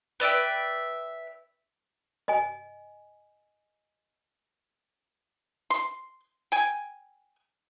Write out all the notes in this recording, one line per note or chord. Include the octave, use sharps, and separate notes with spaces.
B4 D5 E5 G5
D#5 G#5
C6
G5 G#5